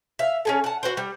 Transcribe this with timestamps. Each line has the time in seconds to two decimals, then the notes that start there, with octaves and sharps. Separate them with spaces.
0.19 E5 F5
0.45 C#4 G#4 A4
0.64 F#5 A5
0.83 F#4 B4 C5
0.97 G3